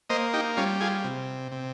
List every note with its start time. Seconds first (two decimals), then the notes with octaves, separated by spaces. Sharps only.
0.10 A#3 C5 D#5
0.34 D#4 G4
0.57 G3 C#4 F4
0.81 F4 G#4
1.04 C3
1.52 C3